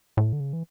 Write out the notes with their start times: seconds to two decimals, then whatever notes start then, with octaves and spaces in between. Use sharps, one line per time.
0.17 A2
0.33 D3
0.40 C#3
0.53 E3